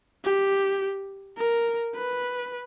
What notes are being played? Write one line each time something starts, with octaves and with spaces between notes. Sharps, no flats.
G4
A#4
B4